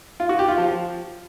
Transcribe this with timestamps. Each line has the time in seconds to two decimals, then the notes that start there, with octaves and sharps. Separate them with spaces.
0.20 F4
0.29 F#4
0.39 G4
0.48 F4
0.58 F3